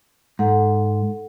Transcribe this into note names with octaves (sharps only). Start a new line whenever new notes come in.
G#2 A4 F#5